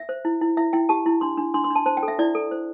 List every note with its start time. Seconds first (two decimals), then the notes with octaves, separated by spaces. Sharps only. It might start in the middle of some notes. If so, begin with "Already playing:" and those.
Already playing: E5
0.09 C5
0.25 E4
0.41 E4
0.57 E4 E5
0.73 E4 G5
0.89 G4 A5
1.06 E4
1.21 D4 C6
1.38 D4
1.54 D4 C6
1.64 C6
1.71 D4 A5
1.86 C5 A5
1.97 G5
2.03 A4
2.08 E5
2.19 E4 D5
2.35 A4
2.51 C5